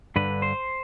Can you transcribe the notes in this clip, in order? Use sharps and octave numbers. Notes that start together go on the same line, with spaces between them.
G2 D3 B4
C5